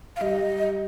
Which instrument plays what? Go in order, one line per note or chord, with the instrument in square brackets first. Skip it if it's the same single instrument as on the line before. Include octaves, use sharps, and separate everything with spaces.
[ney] F5
[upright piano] G3 [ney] D#5